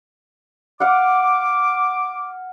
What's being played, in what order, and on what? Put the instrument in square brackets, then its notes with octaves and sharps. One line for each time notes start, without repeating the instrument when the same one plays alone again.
[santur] F5 F#5 [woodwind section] D6